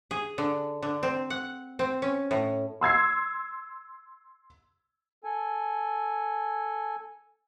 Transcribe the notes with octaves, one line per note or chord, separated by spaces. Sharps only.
G#4
D3
D3
C4
F#5
C4
C#4
A2
C6 E6 G#6 C7
A4 G#5